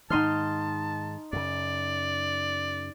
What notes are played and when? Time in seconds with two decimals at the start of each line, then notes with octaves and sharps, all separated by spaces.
0.10 G#2 D#3 D#4 A5 C6 F6
1.33 F#2 C#3 D5